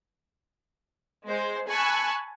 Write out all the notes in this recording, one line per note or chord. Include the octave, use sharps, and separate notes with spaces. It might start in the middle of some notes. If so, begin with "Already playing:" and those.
G#3 C5
G#5 A5 B5 C#6 E6 F#6